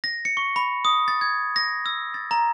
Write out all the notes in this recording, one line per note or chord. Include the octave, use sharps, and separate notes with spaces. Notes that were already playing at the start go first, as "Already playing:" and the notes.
A#6
C#7
C#6
B5
D#6
A6
G#6
A#6
E6
A6
A#5